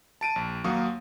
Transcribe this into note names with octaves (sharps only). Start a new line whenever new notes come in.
A5 D7 D#7
A#1
D#2 F#3 A#3 F5 C#6 D#6